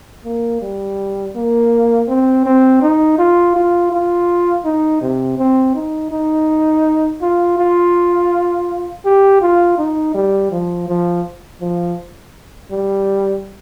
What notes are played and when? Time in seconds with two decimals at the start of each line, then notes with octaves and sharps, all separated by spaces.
0.25 A#3
0.62 G3
1.36 A#3
2.08 C4
2.46 C4
2.82 D#4
3.18 F4
3.56 F4
3.92 F4
4.65 D#4
5.01 C3
5.38 C4
5.75 D#4
6.11 D#4
7.22 F4
7.58 F4
9.05 G4
9.41 F4
9.78 D#4
10.14 G3
10.51 F3
10.88 F3
11.61 F3
12.71 G3